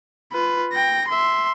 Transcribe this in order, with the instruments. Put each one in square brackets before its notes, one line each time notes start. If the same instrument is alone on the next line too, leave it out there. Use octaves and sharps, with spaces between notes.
[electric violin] F4 B4
G5 A#6
E5 C6